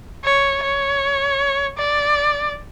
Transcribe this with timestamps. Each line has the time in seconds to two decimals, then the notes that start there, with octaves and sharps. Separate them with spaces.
0.24 C#5
0.63 C#5
1.77 D5